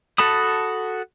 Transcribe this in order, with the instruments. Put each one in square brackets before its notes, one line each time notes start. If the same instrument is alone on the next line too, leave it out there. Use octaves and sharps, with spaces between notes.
[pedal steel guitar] F#4 A4 A5 B5 D#6